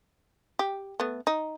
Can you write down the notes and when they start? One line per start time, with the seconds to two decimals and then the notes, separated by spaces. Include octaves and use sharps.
0.59 G4
1.00 A3 B3
1.27 D#4